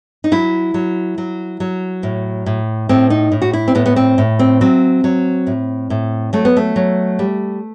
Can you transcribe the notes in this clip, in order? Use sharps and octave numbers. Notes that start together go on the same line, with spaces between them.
D#4
F#3 E4
F#3
F#3
F#3
A2
A2
A2 C4
D#4
A2
F#4
E4
C4
A2 B3
B3
C4
A2
C4
F#3 C4
F#3
A2
A2
F#3 A3
B3
A3
F#3
G3